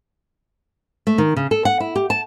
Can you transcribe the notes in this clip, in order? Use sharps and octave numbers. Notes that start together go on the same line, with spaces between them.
A3
D#3
C#3
A4
F#5
E4
G4
A5